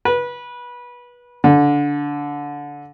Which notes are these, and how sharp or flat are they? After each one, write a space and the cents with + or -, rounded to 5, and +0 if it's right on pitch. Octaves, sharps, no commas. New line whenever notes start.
B4 -20
D3 -15